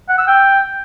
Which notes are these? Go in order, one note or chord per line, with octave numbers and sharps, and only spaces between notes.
F#5
E6
G5